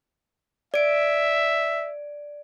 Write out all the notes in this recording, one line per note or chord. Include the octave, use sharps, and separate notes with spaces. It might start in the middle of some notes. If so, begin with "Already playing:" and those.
D5 E5 D7